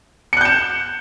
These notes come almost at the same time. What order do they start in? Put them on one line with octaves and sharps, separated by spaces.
C#7 F#6 G6 E7